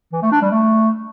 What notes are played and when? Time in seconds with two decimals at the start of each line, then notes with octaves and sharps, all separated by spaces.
0.13 E3
0.22 A3
0.32 D4
0.42 G3
0.52 A3